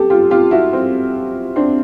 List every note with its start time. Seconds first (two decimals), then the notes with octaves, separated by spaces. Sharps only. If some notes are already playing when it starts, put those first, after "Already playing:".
Already playing: G4 A4
0.10 F4 G4
0.31 F4 G4
0.51 E4 F#4
0.73 C4
1.56 C4 D4